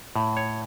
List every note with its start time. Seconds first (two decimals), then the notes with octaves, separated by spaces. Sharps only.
0.16 A2
0.37 C#5